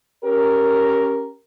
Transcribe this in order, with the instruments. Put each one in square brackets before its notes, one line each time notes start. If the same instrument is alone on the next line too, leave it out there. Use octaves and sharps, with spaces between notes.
[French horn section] C#4 G4 A#4